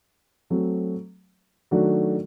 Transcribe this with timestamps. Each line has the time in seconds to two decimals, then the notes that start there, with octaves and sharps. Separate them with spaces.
0.50 F#3 A3 C4
1.71 D#3 F#3 A3 D4 F#4